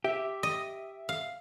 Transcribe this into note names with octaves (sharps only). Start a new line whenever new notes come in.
G4 E5
D#5
F5